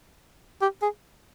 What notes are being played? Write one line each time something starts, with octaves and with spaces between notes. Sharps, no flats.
G4
G#4